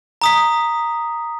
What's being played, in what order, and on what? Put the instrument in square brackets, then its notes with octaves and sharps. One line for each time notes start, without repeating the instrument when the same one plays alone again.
[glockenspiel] A#5 D#6 B6